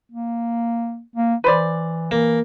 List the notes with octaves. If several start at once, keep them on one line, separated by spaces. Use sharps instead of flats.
A#3
A#3
E3 B4 C5 D5
E3 A#3